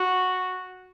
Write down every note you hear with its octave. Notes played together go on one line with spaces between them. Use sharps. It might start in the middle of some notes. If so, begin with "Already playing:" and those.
Already playing: F#4